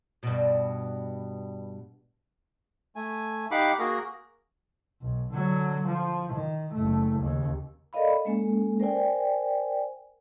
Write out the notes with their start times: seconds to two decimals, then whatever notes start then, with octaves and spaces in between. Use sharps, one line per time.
0.23 G2 B2
2.96 A3 G#5
3.51 D#4 G4 F5 F#5 B5 D6
3.79 A#3 F#4 G#4 A#4
5.01 B1
5.33 D3 F#3
5.87 F3
6.33 D#3
6.74 F#1 A3
7.19 D#2 C#3
7.93 A4 A#4 D5 D#5 F5 B5
8.25 G#3 A#3 C#4 A4 G#5
8.80 A#4 C5 D5 G5 G#5